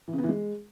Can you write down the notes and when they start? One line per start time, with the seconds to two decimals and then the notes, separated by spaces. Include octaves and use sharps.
0.08 E3
0.13 C#3
0.18 B3
0.24 E3
0.29 G#3